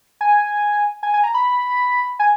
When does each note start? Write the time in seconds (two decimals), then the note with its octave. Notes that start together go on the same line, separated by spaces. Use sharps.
0.21 G#5
1.03 G#5
1.14 G#5
1.24 A#5
1.34 B5
2.19 G#5